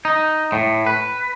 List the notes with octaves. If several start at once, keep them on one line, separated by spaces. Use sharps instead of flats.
D#4
A2
B4